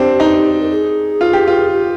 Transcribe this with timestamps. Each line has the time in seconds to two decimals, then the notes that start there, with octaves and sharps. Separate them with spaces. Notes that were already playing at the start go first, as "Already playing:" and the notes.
Already playing: C4 D4 G4
0.20 D#4
0.60 A#4
0.70 G#4
1.21 F4
1.33 G4
1.48 F4
1.72 G4